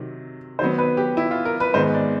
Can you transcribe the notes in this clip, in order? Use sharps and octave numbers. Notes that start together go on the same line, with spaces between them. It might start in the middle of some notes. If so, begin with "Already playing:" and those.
Already playing: C3 D#3 F#3
D#3 F#3 B3 C5
B4
G4
E4
F4
A#4
B4
G#2 D#3 G#3 B3 C5
D5